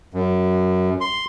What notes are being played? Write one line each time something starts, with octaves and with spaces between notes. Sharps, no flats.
F#2
C6